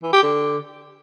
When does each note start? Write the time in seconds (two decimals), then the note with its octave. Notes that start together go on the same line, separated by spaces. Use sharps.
0.03 E3
0.13 G4
0.23 D3